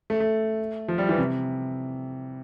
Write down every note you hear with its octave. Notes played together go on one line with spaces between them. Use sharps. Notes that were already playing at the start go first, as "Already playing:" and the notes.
A3
A3
F3
G3
E3
C3